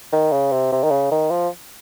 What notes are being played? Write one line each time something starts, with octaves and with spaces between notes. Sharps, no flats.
D#3
C#3
C3
C3
D#3
C#3
D#3
F3